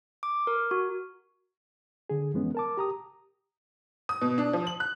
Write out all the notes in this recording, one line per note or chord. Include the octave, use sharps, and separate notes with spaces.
D6
A#4
F#4
D3 G#4
F2 E3 G#3 B3 C#4
A#4 A5 D6
G4 A#5 D#6
D#6
B2
D4
F3
F#7
F#6